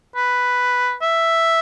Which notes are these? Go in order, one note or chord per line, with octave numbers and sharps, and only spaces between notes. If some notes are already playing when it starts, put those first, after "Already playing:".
B4
E5